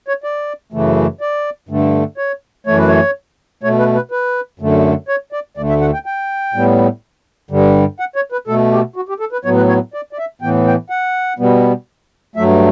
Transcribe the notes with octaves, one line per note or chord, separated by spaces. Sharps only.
C#5
D5
F#2 C#3 E3 A3
D5
G2 D3 A3
C#5
F#2 E3 A3 C#5
B4
C#5
B2 A3 C#5
B4
B4
B4
F#2 D3 A3
C#5
D5
D2 D3 A3 D5
E5
F#5
G5
G5
A2 G3 B3
G2 D3 G3
F#5
C#5
B4
B2 A3 A4
G4
F#4
G4
A4
B4
A2 F#3 B3 C#5
B4
C#5
D5
D5
E5
A2 E3 B3 G5
G5
F#5
B2 G3 B3
G2 F#3 A3 E5